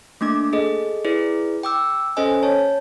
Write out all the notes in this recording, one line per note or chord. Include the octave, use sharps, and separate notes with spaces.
A3 A#3 D4 D6
G#4 A4 D#5
E4 G#4 B4 D5
G5 D6 E6
C#4 A4 C5 D#5 G#5
C#5 A5